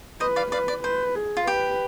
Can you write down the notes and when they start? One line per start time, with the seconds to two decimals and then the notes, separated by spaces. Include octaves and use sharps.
0.20 B4 C5 D#5
0.36 D5 F5
0.52 B4 D5 F5
0.68 D5
0.84 B4 C5
1.16 G#4
1.37 F4
1.47 G4 B4